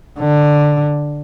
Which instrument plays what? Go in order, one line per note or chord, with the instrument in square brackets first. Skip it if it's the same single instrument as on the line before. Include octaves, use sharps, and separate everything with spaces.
[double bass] D3